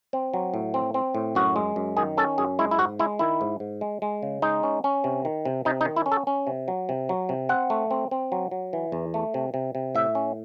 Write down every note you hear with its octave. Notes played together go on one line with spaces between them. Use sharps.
C4
F#3
A2
C4
C4
A2
F#2 F#4
G#3
F#2
D#3 G#4
C#4 A4
F#2 G#4
G#3 E4
E4
G#2 F#4
G#3 E4
D#3 E4
G#2
G#2
G#3
G#3
C#3
G#3 D#4
C#4
C#4
C3
D#3
C3
C3 D#4
D#4
D#3
E4
C#4
A4
C#4
C3
F#3
C3
F#3
C3
C4 F#5
A3
C4
C4
F#3
F#3
E3
E2
A3
C3
C3
C3
A2 E5
C#4